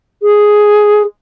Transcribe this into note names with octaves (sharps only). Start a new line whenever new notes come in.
G#4